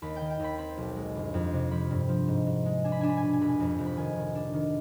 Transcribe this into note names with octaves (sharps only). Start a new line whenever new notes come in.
D#2 B5
D#3 G5
G5
D#2 B5
C4 B5
B1
G#3
G1
F2
C3
F3 B5
G2
F3
G#2
G#2
G#3
D4 G#5
B5
D4 G#5
B5
G#5
B2 B5
G#5
F1 B5
G#5
F2
F1
B5
D#3 G#5
D#3
D4
D#3